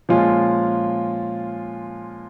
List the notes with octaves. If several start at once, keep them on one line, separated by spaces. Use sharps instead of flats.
A#2 F3 G#3 C#4 F4